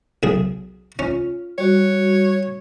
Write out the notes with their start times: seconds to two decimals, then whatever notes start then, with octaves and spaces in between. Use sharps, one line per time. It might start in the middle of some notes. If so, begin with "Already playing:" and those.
0.23 B1 G#4
0.99 C#4 F4
1.58 G3 F#4 C#5